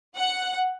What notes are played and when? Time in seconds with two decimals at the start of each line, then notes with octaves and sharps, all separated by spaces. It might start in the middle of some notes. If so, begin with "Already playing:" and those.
0.16 F#5